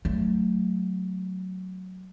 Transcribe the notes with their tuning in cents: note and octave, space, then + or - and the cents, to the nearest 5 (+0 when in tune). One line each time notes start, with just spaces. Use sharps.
F#3 +0 A3 +0